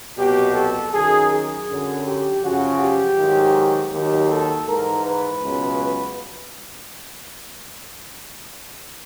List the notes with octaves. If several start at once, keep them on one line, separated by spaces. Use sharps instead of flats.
C2 B2 F#3 G4
A4
F#2 D#3 F#3 G#4
G#4
F#2 D3 F#3
G4
F#2 C#3 F3 F#4
G4
G#2 D#3 F#3
D#2 D#3 F#3 G4
A4
G#2 E3 A#4
B4
C#2 B2 F#3